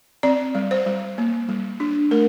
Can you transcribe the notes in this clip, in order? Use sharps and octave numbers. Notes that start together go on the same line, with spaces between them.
C4 D5
G3
C5
G3
A#3
G3
D4
A3 A#4